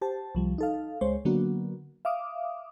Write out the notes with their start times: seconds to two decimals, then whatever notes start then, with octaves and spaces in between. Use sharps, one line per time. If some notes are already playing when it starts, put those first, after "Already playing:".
0.02 G4 C5 A5
0.35 C2 F3 G3
0.58 D#4 A4 F5
1.01 C#2 G#3 C5 C#5
1.25 D3 F#3 A#3 B3 D4 F#4
2.05 E5 F5 D6 D#6